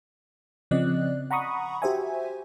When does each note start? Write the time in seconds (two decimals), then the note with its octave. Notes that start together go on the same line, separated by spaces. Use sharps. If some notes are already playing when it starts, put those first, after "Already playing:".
0.71 C#3 F3 C4 D5 D#5 F#6
1.31 F#5 A#5 B5 C#6 D#6
1.82 F#4 G4 C5 E5 G#5